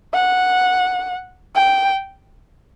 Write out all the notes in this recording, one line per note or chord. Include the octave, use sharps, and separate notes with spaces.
F#5
G5